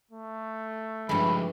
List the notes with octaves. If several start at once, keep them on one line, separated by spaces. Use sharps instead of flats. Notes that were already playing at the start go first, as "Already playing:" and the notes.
A3
G2 E3 F3 G#3 B5